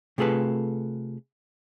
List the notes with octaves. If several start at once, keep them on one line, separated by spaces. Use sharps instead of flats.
C3 A3 F4 G#4 A4 B4